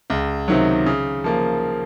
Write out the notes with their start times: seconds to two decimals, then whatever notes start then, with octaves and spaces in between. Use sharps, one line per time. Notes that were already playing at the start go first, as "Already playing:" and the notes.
0.10 C#2
0.48 C3 D#3 F#3
0.86 C#3
1.24 F3 A#3